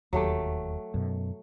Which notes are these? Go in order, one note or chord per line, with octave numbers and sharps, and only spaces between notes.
E1 D#2 F#3 A3 G4
F#2 B2